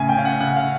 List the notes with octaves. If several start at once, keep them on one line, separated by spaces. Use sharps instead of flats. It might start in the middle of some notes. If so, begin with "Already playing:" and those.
Already playing: A2 C#3 G#5
G5
C#4 F5
F#5
C#3 F#5
F5